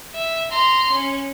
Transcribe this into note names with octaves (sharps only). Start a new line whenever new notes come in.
E5
A#5 C6
C#4